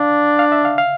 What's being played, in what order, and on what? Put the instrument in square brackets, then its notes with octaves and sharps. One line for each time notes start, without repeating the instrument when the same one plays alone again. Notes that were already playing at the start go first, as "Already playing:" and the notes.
Already playing: [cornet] D4 [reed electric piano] F5
[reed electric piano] F5
E5
F5
F5